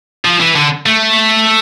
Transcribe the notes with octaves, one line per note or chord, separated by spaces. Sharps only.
F3
E3
D3
A3